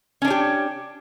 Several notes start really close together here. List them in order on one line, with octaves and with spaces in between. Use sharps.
C#4 D4 C#5 G4